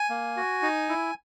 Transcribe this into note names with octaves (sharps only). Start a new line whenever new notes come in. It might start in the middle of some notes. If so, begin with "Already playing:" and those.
Already playing: G#5
A#3
F#4
D#4
E4